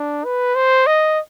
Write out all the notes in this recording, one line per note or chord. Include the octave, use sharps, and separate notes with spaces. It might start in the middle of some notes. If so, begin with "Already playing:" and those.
Already playing: D4
B4
C5
D#5